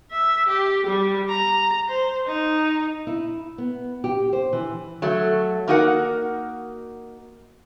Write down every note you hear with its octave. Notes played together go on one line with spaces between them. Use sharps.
E5
G4
G3
A#5
C5
D#4
E4
B3
G4
C5
E3
F#3 A3
A#3 D4 D#4 F#4 A#4 F#5